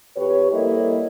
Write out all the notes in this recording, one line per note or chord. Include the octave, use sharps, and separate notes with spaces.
F2 G4 B4 C#5
G3 A#3 E4 A4 C#5 D#5